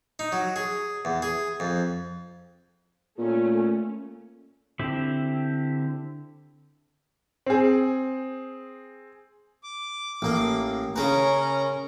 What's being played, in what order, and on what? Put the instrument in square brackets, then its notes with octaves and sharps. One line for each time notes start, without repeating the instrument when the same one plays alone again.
[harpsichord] D#4
F#3
G#4
E2
G#4
F2
[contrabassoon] A#2 [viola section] A3 C#4
[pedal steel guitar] D3 C4 E4 G4
[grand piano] C4 G#4
[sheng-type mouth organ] D6
[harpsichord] A1 A#3
[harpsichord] C#3 B4 [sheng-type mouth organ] C#4 A#4 A#5